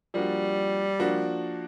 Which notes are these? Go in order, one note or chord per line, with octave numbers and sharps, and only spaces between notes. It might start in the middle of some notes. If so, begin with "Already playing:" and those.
F3 G3 A#3 D4 F#4
F3 A#3 D4 F#4